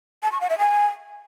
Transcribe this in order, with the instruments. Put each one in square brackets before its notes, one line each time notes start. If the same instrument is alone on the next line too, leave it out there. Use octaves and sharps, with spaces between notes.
[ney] A5
C#6
F#5
E5
G#5